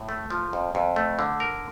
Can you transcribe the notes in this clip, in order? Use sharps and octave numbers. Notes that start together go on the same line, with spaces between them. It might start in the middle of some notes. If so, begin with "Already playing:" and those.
Already playing: A2
A3
F3
F2
F2
A3
D3
A#4